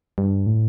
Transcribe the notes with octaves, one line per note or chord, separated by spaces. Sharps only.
G2
A2